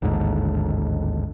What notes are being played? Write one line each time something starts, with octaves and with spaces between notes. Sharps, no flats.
A1 D#2 G#2 D3